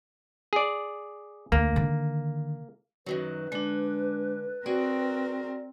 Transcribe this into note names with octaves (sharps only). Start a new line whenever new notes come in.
G#4 D5
D2 A#3
D3 D#3
F#2 D#3 F#3 B4
D3 G#3 D4
C4 F#4 G#4 A#4 D5 G5